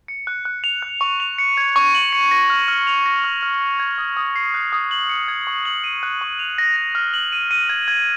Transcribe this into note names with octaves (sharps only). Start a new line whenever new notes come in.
C#7
F#6
F#6
F7
F#6
C#6
F7
C#7
G#6
C#6
F#7
C#7
A#6
F6
F6
F7
A#6
F6
F6
C#7
G#6
D#6
D#6
C7
F#6
D#6
F#7
C#7
G#6
C#6
F#7
D#7
F#6
C#6
F7
A#6
A#6
F6
F#7
D#7
D#7
G#6
G#6